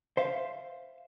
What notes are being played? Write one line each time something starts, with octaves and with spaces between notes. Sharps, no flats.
C5 E5 F5